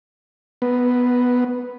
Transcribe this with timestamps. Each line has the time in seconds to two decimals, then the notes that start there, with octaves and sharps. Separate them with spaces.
0.62 B3